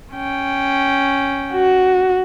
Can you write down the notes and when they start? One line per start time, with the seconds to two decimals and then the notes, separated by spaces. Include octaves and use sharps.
0.13 C#4 G5
1.53 F#4